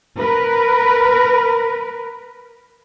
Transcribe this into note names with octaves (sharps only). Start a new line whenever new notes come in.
A#4 B4